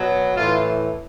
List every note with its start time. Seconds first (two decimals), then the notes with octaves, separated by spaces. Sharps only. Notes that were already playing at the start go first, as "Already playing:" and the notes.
Already playing: B2 F#3
0.36 A2 E3 F4